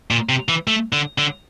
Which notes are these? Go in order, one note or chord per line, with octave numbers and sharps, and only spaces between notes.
A#2
C3
E3
A3
D3
D3